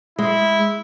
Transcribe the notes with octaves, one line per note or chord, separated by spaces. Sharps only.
G#3 E4